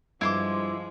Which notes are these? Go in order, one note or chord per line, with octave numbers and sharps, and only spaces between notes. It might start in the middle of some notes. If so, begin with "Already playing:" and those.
G2 F3 G#3 E4 C6 D6